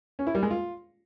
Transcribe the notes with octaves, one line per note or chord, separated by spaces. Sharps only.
C#4
E4
G3
G#3
F4